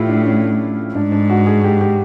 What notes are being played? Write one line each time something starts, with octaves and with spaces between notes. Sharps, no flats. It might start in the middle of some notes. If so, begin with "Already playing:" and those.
Already playing: A2 E4 F4 G4
D4
C#4
G#2 D4
D4
F#4
G#4
G4
G4